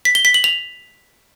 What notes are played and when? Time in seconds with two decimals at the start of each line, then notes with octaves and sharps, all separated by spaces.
0.05 B6
0.15 G7
0.25 B6
0.34 F#7
0.44 F7